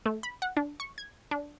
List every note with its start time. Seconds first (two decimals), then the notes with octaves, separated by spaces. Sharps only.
0.06 A3
0.23 B5
0.42 F#5
0.57 D4
0.80 C#6
0.98 G#6
1.31 D4